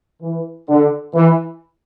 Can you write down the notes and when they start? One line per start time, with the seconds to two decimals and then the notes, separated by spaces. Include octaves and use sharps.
0.22 E3
0.69 D3
1.15 E3